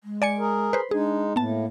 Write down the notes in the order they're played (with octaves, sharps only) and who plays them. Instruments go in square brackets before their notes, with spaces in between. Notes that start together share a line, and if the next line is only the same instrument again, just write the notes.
[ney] G#3
[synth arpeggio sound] D5 G#5 C#7
[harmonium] G#4 A#4
[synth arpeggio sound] B4 C5
[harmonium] G#3 D#4 [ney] D4 [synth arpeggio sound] G#4
[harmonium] A2 [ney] A#3 [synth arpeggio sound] B3 A5